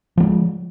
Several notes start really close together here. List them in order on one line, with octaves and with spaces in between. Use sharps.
F3 A#3 G#3